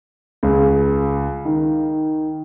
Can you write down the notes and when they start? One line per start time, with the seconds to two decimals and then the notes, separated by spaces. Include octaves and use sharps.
0.43 C#2
1.45 D#3